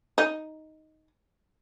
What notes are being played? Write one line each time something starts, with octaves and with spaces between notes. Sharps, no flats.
D#4